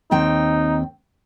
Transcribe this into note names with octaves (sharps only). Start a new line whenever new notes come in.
D#2 C4 D#4 G5